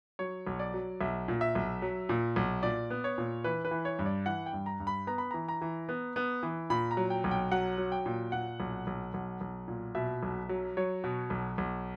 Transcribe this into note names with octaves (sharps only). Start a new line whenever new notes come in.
F#3 C#5
B1
D5
F#3
B1 E5
A#2
E5
B1
F#3
A#2
B1
A#2 D5
B3
C#5
A#2
E3 B4
B4
E3
C#5
G2
D5
E3 F#5
G5
G2
A#5
G2
B5
B3 A#5
B5
E3 A#5
A#5
E3
B3
B3
E3
A#2 B5
A#5
F#3
G5
B1
G5
F#3 F#5
F#3
G5
A#2
A#2 F#5
B1
B1
B1
B1
A#2
B2 E5
B1
F#3
F#3 C#5
B2
B1
B1